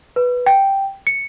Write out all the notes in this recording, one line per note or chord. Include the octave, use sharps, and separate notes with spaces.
B4
G5
C#7